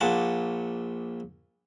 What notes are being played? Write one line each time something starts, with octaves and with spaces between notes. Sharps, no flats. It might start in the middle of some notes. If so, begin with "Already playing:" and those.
A#1 A#2 F#5 A5